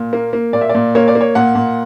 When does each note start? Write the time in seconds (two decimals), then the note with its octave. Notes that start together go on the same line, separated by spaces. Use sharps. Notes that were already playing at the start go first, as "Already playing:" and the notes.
Already playing: A#2
0.13 A#3
0.33 A#3
0.53 A#2 D5
0.61 E5
0.69 D5
0.75 A#2
0.95 A#3 C#5
1.08 D5
1.15 A#3
1.21 C#5
1.35 A#2 F#5
1.55 A#2